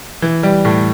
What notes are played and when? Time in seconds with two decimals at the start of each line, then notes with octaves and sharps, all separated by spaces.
0.22 E3
0.43 G3
0.65 A2